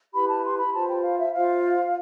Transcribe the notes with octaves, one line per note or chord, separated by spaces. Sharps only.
E4 G4 B4 B5
A5
C6
B5
F4 C5 A5
G5
F5
E5
F4 C5 F5